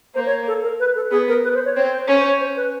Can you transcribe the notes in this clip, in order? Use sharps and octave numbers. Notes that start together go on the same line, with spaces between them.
A#3 C5
C#5
A4
A#4
B4
A4
B3 G#4
A#4
B4
C5
C#5
C4 C#5
C5
C#4 C#5
C5
C#5
C5
B4